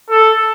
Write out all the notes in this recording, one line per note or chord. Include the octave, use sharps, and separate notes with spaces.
A4